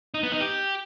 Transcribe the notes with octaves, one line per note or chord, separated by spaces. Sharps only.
D#4
B3
D#4
G4